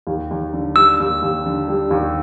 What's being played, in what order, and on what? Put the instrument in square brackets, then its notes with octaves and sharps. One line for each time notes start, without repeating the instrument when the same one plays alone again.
[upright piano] D#2
D#2
D3
[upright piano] G3 [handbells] E6
[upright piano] D#2
D#2
D3
G3
D#2